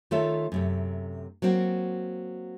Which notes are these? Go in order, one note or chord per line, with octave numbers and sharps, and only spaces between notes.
D#3 A3 F4 A4 C#5 E5
F#2 C3 A3
F#3 A#3 C4 F#4